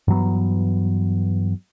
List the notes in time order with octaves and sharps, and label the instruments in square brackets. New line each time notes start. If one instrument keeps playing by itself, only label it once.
[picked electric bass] G2 E3 F#3 B3